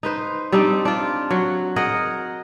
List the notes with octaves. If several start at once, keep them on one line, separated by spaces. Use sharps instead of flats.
D#4 B4 C5
G3 C4 D4 D#4
D4 F4
F#3 F#4
G#4 A#4 D#5 F#5